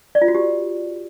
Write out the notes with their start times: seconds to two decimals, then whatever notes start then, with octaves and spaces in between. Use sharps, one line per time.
0.15 D5
0.22 F4
0.28 F#4
0.35 G4